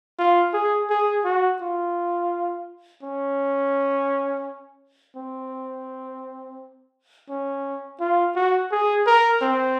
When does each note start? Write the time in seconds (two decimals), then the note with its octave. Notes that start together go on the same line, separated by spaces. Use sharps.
0.19 F4
0.54 G#4
0.90 G#4
1.25 F#4
1.61 F4
3.03 C#4
5.16 C4
7.29 C#4
8.00 F4
8.36 F#4
8.72 G#4
9.07 A#4
9.42 C4